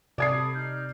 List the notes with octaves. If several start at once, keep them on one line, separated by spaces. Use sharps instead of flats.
C3 A4 D5 B5 D#6 G#6 C7
D#4 F6 G6